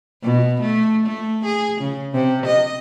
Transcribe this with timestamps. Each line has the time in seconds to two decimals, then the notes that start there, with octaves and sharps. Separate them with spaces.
0.23 B2
0.61 A3
1.06 A3
1.45 G#4
1.81 C#3
2.13 C3
2.46 D#5